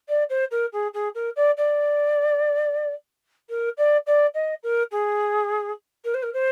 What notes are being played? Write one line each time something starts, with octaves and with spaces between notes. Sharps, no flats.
D5
C5
A#4
G#4
G#4
A#4
D5
D5
A#4
D5
D5
D#5
A#4
G#4
A#4
C5
A#4
C5